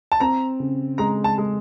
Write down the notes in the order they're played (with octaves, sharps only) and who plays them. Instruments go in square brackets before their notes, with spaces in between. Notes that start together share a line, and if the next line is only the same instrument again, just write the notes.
[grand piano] A5
[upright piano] C4 [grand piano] A#5
[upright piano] C#3
[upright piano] G#3 [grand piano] A#5
[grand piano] A5
[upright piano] G#3